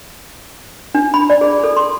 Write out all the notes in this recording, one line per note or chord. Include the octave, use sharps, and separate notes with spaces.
D4
B5
D5
G#4
A4
C6